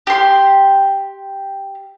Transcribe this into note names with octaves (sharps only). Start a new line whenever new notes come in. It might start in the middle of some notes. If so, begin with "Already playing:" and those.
G4 C6